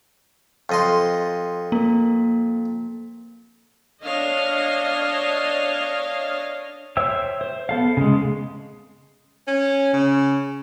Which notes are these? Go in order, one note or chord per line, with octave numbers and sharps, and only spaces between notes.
F2 D#5 C6
A#3
D4 C#5 D#5 F5
C5 C#5 E5 G5 E6
C5
B3 A4 F5
C#3 G#3
C#4
C#3